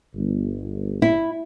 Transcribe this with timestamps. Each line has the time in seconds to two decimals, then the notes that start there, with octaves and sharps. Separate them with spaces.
0.15 G1
1.02 E4